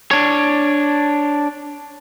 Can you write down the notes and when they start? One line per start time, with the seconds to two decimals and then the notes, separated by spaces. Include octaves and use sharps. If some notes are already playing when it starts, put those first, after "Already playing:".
0.11 D4 C#5